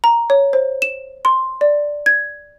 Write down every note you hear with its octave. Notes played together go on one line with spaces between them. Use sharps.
A#5
C#5
C5
E7
C6
D5
G#6